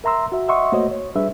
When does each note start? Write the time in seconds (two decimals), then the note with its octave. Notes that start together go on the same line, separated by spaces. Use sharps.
0.04 A#4 E5 A#5 C6 E6
0.32 F#4 E5
0.48 D#5 E5 F#5 C6 C#6 D#6
0.72 A3 A#3 F#4 C5 C#5 D#5
0.91 C#5
1.15 G3 D4 G#4 B4 E5